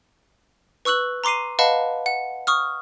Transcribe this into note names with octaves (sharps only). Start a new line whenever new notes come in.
B4 C#6 E6 F#6 F#7
A#5 C6 D6 C7 D#7
B4 D#5 F5 F#5 A5 B5
F#5
C#6 D#6 F6